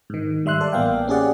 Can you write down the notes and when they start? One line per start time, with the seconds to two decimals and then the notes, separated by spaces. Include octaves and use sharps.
0.10 G#2 D#3
0.45 G#2 G3 E5 C6 F#6
0.61 A4 D5
0.73 A1 A#3 B3 D5 F5 G5
1.08 C#4 G4 G#4 D5 F#5